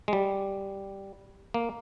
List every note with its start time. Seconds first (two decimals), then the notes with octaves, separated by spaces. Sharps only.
0.08 G#3
0.13 G3
1.54 A#3